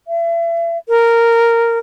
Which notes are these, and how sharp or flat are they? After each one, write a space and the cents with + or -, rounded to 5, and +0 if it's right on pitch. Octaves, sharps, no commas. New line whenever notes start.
E5 +40
A#4 -10